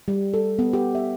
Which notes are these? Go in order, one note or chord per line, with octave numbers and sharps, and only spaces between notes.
G3
A4
B3
G4
E5